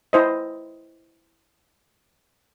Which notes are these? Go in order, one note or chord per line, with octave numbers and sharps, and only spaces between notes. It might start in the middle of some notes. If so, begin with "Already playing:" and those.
E4 C5 D#5